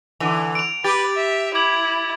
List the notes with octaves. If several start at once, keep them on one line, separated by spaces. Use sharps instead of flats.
D3 E3 F7
D7 F7
G4 B4 A6
E5
E4 D6 G#6 F#7